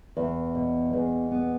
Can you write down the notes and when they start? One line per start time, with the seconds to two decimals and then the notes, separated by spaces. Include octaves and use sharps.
0.17 E2
0.55 B2
0.93 E2
1.31 B3